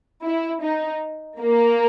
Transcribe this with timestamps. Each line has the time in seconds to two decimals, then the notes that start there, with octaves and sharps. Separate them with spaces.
0.24 E4
0.63 D#4
1.40 A#3